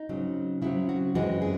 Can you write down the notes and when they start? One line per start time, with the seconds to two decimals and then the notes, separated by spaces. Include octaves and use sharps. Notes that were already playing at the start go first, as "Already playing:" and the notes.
Already playing: D#4
0.09 C#3 F#3 C4
0.62 C#3 F#3 C4 E4
0.89 F#4
1.15 F#2 E3 G#3 C4 F#4
1.42 G#4